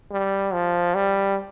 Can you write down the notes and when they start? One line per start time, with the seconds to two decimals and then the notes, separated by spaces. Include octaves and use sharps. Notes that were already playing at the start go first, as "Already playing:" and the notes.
0.11 G3
0.53 F3
0.95 G3